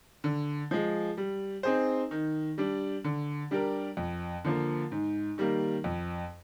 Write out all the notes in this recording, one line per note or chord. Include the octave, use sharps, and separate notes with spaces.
D3
F3 G#3
G3
C4 D#4 G#4 C5
D#3
G3 D4
D3
G3 D4 G4 A#4
F2
D3 F3 A#3
G#2
D#3 G3 A#3
F2